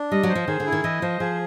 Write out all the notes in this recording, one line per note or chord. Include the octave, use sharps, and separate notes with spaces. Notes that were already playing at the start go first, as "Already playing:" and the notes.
Already playing: D4
G3 D#5
F#3
C5
F3
D#3 G#4
D3
E4
D#3
E3 D#5
F3 C5
F3 G#4